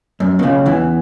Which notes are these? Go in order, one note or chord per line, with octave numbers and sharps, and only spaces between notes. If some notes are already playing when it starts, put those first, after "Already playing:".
F#2
B2
C#2 C#3
E2 E3